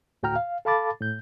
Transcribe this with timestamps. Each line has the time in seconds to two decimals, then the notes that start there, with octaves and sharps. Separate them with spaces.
0.23 D2 A2 F#4 G5 A#5 F6
0.36 F5
0.65 A4 F5 A5 B5 D6 A6
1.01 A2 G6